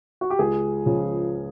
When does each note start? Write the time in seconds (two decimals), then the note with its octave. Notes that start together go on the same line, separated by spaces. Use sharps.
0.21 F#4
0.30 G4
0.39 C#2 G#4
0.86 C#3 F3